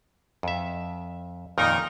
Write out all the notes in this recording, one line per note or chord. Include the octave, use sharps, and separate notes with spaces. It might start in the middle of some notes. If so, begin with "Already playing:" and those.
F2 E5
F2 A#2 D#3 D#4 A#4